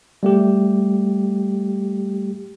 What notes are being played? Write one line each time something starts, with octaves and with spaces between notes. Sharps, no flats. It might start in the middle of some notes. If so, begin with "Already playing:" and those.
G3 A3 G4